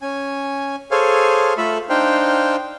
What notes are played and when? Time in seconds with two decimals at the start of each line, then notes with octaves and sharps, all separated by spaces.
0.02 C#4 G#5
0.91 G#4 A4 C5 C#5 F5 G#5
1.58 A3 F4 A4 E5 B5
1.89 D4 D#4 C5 F5 G5